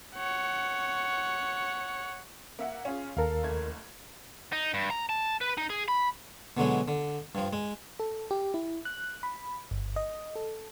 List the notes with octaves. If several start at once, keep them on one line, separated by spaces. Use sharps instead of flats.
C#5 F#5
A#3 E5 F#5
C#4 F4 G#4
D#2 A4 A#4 F5
F#1 A3 G#6
D#4
G2
A#5
A5
B4
D#4
G#4
B5
B2 D3 F#3 G#3
D3
G2 F3
G#3
A4
G4
E4
F#6
B5
G1
D#5
A4